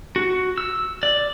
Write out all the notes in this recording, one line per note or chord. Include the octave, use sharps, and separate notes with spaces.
F#4
E6
D5